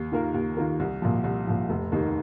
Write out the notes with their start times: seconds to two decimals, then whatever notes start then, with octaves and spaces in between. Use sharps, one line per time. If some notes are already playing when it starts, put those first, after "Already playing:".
Already playing: D#2
0.12 D#3 A#3 F4 A#4
0.34 D#2
0.57 D#3 A#3 F4 A#4
0.80 C2
1.02 A#2 F3
1.24 C2
1.47 A#2 F3
1.70 F1
1.92 D#2 D#3 A#3 D#4